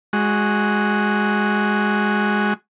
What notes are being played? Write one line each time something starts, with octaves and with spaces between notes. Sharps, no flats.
G#3 F#4